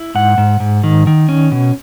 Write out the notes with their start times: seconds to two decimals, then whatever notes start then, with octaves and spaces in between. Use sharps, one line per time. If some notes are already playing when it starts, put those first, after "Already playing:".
Already playing: E4
0.15 G#2 F#5
0.38 G#2
0.60 G#2
0.84 D#3
1.07 D#3
1.29 C#4
1.52 B2